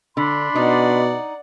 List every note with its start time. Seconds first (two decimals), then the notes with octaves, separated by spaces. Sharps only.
0.17 D3 D4 B5 C6
0.55 B2 D#4 D5 F#5